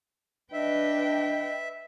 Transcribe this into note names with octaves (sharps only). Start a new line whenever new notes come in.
D4 B4 D#5 E5 G5